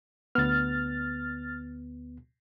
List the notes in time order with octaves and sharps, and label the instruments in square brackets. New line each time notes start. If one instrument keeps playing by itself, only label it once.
[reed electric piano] D2 B3 [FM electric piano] F6 A6